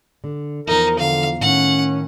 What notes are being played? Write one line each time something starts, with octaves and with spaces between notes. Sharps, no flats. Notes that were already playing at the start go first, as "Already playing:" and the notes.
D3
E2 F3 D#4 A#4
D3 F5
A2 D#3 C#4 F#5